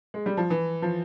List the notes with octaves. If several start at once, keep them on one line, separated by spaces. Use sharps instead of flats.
G#3
G3
F3
E3
F3